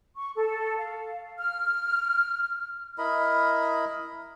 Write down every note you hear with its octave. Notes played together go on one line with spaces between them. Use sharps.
C#6
A4
F5
F6
E4 A#4 D#5 B5